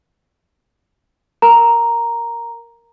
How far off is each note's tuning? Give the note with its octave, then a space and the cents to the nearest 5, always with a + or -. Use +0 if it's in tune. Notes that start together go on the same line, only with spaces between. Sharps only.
A#4 +0 A#5 +0